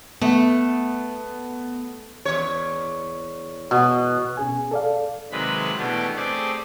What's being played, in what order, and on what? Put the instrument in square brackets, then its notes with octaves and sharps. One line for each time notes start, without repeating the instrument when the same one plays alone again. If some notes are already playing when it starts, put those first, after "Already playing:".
[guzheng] A3 [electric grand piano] B3
[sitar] E2 C#5
[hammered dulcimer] B2
[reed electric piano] B2 C#4 G#4 G#5
A4 D5 F5
[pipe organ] C3 D#3 F#3 G#3 B4 B5
B2 E3 A3 B3 D4 G4
A3 C4 G4 G#4 D5